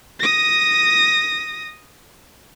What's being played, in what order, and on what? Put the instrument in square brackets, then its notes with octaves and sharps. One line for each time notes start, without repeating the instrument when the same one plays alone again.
[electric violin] D#6 A#6